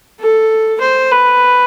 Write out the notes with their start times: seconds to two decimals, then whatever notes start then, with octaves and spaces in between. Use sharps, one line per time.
0.20 A4
0.81 C5
1.12 B4